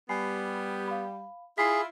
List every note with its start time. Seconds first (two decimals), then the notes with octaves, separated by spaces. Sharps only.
0.09 G3 B3 G#5 B5 C7
0.88 F5 B5
1.58 E4 F4 G#4 B6 C7